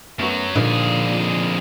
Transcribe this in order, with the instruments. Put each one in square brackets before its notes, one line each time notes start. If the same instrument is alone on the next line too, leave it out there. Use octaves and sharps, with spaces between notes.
[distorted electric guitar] F#2 F#3 [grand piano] A3 B3 F#4
[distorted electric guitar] F2 G#4 [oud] A#2 [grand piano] D3 A#3 D#4